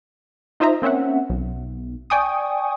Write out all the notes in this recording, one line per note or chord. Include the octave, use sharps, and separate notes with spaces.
D#4 F4 C5 D#5 E5 A#5
A#3 C4 C#4 E5 F#5
B1
D5 G5 G#5 C#6 D#6